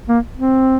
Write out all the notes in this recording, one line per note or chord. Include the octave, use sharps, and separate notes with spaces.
A#3
C4